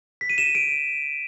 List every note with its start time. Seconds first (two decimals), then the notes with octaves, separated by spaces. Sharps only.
0.21 B6
0.30 D#7
0.38 E7
0.46 D#7
0.55 D7